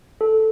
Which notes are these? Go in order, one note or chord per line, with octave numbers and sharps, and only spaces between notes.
A4